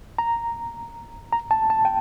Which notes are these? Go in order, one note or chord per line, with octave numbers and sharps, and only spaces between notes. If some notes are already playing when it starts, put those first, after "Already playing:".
A#5
A#5
A5
A5
G5